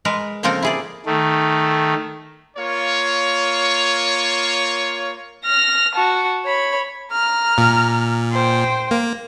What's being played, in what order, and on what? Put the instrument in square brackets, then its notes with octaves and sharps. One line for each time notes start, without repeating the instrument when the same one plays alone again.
[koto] G#3 A#4 B4
C#3 F3 A#3 C4 A4 A#4
E4 G#4 D5
[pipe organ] D#3 A3
[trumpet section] A#3 F4 C#5
[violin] F6 A#6
F#4 A5
C#5 B5
[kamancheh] A#5 F6
[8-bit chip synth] A#2
[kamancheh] C5 G5
[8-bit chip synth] A#3